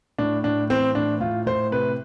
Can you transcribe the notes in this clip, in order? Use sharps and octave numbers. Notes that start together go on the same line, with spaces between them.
A2 D4
A2 D4
E3 C4
A2 D4
A2 F4
A2 C5
C3 B4